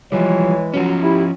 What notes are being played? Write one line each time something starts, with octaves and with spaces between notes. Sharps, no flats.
E3 F3 G3 G#3 C#5
F3 F#3 C#4
E4 G4